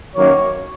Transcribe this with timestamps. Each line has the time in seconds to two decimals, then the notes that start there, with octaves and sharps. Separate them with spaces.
0.15 F#2 D#3 F#3 A#3 C#5